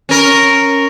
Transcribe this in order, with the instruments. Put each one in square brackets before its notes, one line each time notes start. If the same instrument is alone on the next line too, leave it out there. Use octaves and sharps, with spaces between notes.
[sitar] C#4 A#4